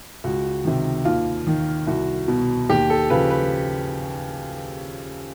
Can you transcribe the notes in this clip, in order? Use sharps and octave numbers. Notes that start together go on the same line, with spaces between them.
C#2 F#4
C3 D#3
D#2 F4
D#3
C2 F#4
B2
D#2 G4
A4
C#3 F3 B4
B4